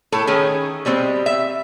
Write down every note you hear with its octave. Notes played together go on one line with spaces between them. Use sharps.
A2 A4
D#3 A3 C#4 G#4
B2 G3 G#3 C4
E5